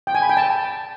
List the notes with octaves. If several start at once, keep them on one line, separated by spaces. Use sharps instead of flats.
G5
G#5
B5
G5
A5